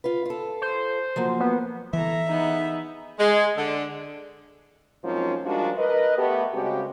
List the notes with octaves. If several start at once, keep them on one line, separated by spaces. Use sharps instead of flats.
F4 B4
F4 A4
C5
F3 F#3 A#3
B3
E3 A4 E5 A#5
B3 D#4 G#4
G#3
D3
G#2 F3 F#3 A#3 C4 C#4
F3 G3 G#3 D4 F#4 A#4
A#4 B4 D#5
A3 B3 G4
C#3 G3 G#3 C4 F#4 G4